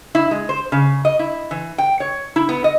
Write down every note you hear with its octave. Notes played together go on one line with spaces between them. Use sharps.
E4
G#3
C5
C#3
D#5
E4
E3
G5
C#5
E4
B3
D#5